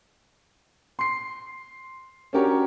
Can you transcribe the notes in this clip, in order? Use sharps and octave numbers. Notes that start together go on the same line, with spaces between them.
C6 C7
C#4 D4 F#4 G4 A#4 C#5